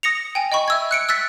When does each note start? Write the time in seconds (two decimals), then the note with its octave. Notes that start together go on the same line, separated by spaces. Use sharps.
0.03 D#6 A#6 C#7 F7
0.35 G5 G#5
0.52 D#5 G5 B5 C#6
0.68 E5 E6 G#6
0.91 F#6 C#7 D7
1.09 E6 F#6 A6 B6